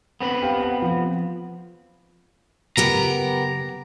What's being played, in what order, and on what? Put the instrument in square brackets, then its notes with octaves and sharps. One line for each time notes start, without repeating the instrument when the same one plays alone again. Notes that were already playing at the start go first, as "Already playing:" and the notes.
[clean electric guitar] B3 C4 B4
[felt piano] G4 F5 G5
F#5
F3
[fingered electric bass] C#3 F#3 A#3 [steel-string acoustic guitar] B3 G4 A#4 [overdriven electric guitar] A#5